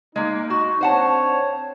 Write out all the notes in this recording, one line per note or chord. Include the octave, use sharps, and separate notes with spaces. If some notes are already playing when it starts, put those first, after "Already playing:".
G#3 A#3 D#4
F#4
C4 D4 C5 C#5 F#5 A5